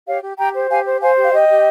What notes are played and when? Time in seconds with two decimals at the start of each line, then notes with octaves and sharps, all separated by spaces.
0.07 G4 C#5 F5
0.23 G4
0.38 G4 G5 A#5
0.55 C5
0.70 G4 F5 G#5
0.85 C5
1.01 C5 F5 G#5
1.17 G4
1.23 F5
1.32 G4 D#5 G5
1.48 G4